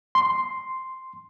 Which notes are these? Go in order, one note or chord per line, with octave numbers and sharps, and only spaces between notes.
C6